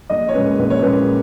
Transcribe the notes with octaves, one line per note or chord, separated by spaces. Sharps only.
A#1 D#5
C#5
A#2 G#3 C#4 B4
A#1 B4
C#5
A#2 G#3 C#4 B4